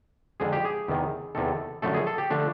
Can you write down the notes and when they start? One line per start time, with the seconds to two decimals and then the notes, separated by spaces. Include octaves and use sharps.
0.40 F2 D3 F3 G#3 G#4
0.53 G4
0.65 G#4
0.88 E2 C3 D#3
1.35 E2 C3 D#3 A4
1.82 F#2 D3 F3 A3 A4
1.95 G#4
2.07 A4
2.18 G4
2.30 D3 F3 A3 D4